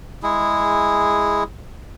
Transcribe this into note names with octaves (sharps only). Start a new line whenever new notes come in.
G#3 E4 G#4